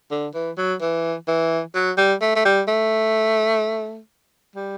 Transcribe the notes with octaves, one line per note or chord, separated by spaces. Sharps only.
D3
E3
F#3
E3
E3
F#3
G3
A3
A3
G3
A3
G3